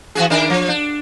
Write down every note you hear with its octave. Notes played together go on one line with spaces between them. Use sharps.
E3 F#4 G#4
D#3 D4 A#4
F3
D4